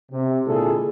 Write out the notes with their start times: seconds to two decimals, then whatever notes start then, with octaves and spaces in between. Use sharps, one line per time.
0.11 C3
0.46 A#2 D3 G#3 E4 G#4 A4